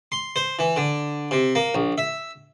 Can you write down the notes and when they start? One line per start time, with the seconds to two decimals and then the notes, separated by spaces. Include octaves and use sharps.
0.12 C6
0.36 C5
0.59 E3
0.76 D3
1.31 C3
1.55 A#3
1.74 A#1
1.98 E5